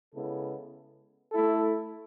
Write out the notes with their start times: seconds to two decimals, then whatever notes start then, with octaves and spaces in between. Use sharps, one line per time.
0.14 C#3 G#3 B3 E4 A4
1.32 A3 E4 A4